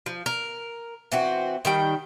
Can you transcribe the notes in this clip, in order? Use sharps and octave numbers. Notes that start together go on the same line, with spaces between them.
F3
A#4
E3 C4 F#4
D#3 G3 G5